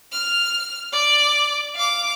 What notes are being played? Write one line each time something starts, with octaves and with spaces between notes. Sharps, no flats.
F6
D5 D6
F5 D6